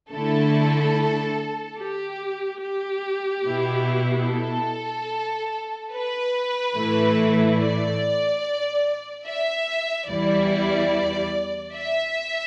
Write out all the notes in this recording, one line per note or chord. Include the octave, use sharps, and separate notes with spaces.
D3 A3 E4 A4
G4
G4
B2 B3 E4
A4
B4
A2 E3 A3 E4
D5
E5
E2 E3 G3 E4 D5
E5